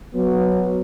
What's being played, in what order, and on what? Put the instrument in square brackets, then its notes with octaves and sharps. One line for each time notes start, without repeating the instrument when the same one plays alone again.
[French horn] F#3 [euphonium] B3